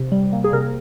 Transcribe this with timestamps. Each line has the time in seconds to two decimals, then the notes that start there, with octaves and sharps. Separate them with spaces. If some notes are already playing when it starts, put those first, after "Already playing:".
Already playing: C3
0.12 G3
0.33 A#3
0.44 G#4
0.53 C3 A#4